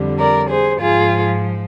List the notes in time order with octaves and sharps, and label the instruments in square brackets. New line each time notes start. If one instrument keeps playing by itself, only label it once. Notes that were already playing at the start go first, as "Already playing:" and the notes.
Already playing: [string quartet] F2 D3 G3
A#4 D5
G#4 C5
G#2 F3 F4 G#4